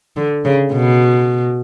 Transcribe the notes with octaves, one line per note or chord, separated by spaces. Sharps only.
D3
C#3
B2